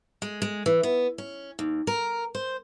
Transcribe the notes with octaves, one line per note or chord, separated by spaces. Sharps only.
G#3
G#3
E3
B3
C#4
D#2
A#4
C5